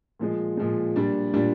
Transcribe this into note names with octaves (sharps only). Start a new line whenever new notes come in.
A#2 F3 G#3
A#2 F3 G#3
A#2 G3 D4
A#2 G3 D4